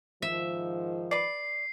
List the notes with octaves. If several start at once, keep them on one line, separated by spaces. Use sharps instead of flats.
G#2 D#3 F3 E5
B4 D5 C7